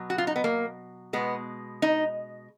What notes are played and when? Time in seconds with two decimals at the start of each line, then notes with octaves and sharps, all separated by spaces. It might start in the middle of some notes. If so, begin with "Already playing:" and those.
Already playing: B2 F#3
0.10 F#4
0.18 F4
0.27 D#4
0.36 B3
0.44 A#3
1.13 B2 G#3 B3
1.82 D#4